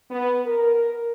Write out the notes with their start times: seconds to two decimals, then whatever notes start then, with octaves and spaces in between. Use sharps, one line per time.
0.10 B3
0.46 A#4